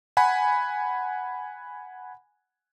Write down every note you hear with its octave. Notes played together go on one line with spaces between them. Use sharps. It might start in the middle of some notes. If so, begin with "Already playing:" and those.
F#5 G#5 B5